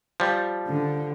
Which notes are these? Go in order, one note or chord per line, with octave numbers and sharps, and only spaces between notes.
F3 G3
D3